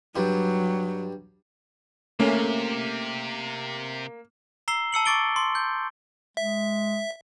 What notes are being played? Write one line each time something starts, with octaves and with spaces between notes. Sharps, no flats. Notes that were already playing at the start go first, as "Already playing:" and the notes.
G2 F#3 G3
C3 A3 A#3 C#4
A#5 E6 C7 G7
A5 E6 C#7 F#7
C#6 D6 A6 D7 G7
C6
G6
G#3 E5